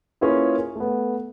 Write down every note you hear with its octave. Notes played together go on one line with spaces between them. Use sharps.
A#3 C#4 E4 F4 G#4 B4
A3 B3